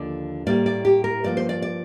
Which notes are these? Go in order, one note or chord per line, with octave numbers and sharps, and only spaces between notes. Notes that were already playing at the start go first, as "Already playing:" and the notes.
Already playing: D#2 D3 F3 D5
A2 G3 A#3 D5
D5
G4
A#4
G2 F3 A#3 D5
C5
D5
D5